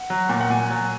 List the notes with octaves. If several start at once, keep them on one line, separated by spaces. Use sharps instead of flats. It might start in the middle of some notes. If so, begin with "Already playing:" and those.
Already playing: F#5
F#3
A#2
F#5
A#2 G#5
F#3